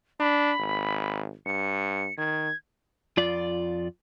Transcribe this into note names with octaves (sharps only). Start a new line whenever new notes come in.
D4 B5
G#1
G2 C#7
D#3 G#6
F2 F4 D5